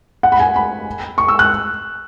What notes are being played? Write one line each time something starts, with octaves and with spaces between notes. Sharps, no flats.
F#5
B5
G#5
B5
C#6
E6
F#6